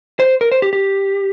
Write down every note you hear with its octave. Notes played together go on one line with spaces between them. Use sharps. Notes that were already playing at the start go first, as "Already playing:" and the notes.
C5
A#4
C5
G4
G4